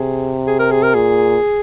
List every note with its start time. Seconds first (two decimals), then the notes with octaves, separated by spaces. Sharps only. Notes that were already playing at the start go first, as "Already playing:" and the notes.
Already playing: C3 G#4
0.47 G#4
0.59 A#4
0.71 G#4
0.83 A#4
0.94 A#2 G#4